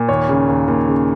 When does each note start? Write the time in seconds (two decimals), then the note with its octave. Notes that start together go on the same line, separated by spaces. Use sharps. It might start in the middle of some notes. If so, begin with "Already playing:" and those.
Already playing: A#2
0.09 D#2 C#5
0.29 C#3
0.49 D#2
0.68 D#2
0.88 C#3